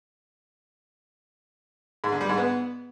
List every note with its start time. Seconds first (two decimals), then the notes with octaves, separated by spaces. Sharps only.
2.04 G#2
2.12 D3
2.21 G3
2.29 G#2
2.38 B3